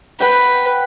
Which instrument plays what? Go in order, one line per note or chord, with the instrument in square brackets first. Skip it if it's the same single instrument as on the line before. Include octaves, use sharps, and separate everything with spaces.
[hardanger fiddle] B4 [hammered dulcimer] F#5 G5